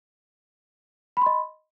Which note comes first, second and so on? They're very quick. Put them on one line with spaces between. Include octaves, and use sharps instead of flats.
B5 C6 D#5